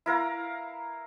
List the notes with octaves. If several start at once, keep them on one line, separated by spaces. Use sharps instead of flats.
E4 A#4 F5 A#5